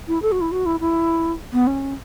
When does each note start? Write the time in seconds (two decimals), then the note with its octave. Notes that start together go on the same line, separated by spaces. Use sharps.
0.08 E4
0.22 A4
0.32 F#4
0.41 E4
0.52 F#4
0.66 E4
0.80 E4
1.53 B3
1.67 C#4